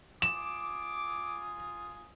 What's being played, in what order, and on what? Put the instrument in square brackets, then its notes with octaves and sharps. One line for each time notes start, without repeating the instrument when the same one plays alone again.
[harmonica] F4 G#5 D#6 [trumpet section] D6 [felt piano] E7